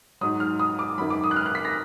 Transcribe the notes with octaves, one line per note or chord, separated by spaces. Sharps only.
G#2 F#3 D#6
F6
D#6
D6
F#2 D#3 F#3 B5
D6
D#6
F#6
F6
F#6
B6
A#6